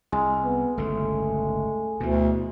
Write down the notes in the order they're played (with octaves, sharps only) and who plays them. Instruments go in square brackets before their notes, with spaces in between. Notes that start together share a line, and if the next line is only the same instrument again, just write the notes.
[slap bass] C2 [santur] G#3
[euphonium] B3
[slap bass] G1 C#2 A2 [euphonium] A3
[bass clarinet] D2 [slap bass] B2 E3